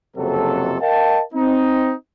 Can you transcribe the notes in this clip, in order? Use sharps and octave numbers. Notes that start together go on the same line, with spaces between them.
F#1 F2 C3 F#3 A4
A#4 D#5 F5 G5 A5
C4 D#4